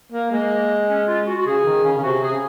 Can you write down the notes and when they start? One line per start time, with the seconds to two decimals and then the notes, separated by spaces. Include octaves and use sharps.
0.12 A#3
0.31 G#3 A#3
0.88 C#4
1.07 F4
1.27 F#4
1.37 F#4
1.46 C#3 G#4
1.65 D#3
1.84 C#3
1.98 C#3
2.03 C3 F#4
2.22 G#4
2.31 C#3